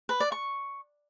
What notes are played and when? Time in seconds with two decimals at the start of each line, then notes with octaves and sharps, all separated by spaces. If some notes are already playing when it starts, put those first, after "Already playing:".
0.09 B4
0.20 D5
0.32 C#6